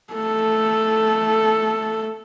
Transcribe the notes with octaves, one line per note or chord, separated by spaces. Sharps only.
A3 A4